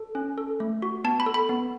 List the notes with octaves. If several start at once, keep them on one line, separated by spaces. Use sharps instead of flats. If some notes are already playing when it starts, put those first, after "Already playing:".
Already playing: A4
C#4
A4
A3
F#4
B3 A5
B5
A4
B5
B3